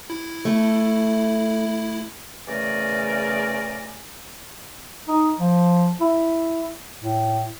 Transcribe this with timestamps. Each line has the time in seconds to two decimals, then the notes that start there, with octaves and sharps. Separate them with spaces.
0.10 E4
0.45 A3
2.47 E2 C#3 A3 A#4 D5 G#5
5.08 D#4
5.39 F3
6.01 E4
7.03 A2